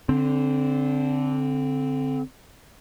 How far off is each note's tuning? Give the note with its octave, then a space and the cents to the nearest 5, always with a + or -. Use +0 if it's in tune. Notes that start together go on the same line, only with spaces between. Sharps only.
D3 -20 C4 +0